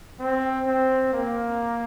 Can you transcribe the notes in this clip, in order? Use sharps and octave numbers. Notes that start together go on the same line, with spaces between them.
C4
C4
A#3